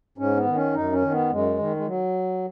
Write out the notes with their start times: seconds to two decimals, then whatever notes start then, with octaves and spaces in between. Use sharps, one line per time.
0.18 G#2 C#4
0.37 B3
0.47 D#3
0.55 C#4
0.74 F#2 D#4
0.93 C#4
1.02 D#3
1.11 B3
1.30 F#2 G#3
1.59 D#3
1.77 G#3
1.87 F#3